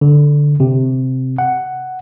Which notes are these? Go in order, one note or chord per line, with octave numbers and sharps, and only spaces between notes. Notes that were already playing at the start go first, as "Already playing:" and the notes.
D3
C3
F#5